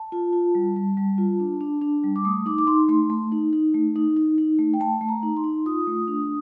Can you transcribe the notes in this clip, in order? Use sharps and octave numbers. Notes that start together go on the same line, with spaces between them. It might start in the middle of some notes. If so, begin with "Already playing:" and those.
Already playing: A5
F4
F4
G3
G3
G3
F4
D4
D4
D4
G3
D6
A3 D#6
D#4 D6
D6
D#4 C6
A3 C6
A3
D#4
D#4
A3
D#4
D#4
D#4
A3
G5
A3 A5
A3
A#5
D#4
C6
D#4
F4 D#6
A3
D4